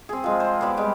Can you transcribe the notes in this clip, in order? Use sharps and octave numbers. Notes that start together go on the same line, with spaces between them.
C4 G#4
F3 G#3
C5
B3 G4 D5 G5
G3 G#3